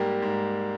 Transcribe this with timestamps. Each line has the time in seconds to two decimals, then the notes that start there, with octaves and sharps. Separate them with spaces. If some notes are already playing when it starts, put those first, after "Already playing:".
Already playing: G#2 G3 A#3 G4
0.22 G#2